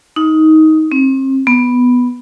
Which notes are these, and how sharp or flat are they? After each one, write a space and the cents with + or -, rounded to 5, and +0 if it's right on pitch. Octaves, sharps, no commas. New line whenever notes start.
D#4 +15
C4 +35
B3 +0